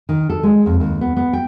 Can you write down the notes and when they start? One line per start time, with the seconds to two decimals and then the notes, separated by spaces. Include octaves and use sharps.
0.09 D#3
0.29 A4
0.43 G#3
0.66 F2
0.80 D#2
1.01 B3
1.17 B3
1.33 G5